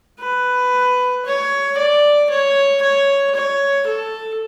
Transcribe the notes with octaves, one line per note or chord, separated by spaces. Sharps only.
B4
C#5
D5
C#5
C#5
C#5
A4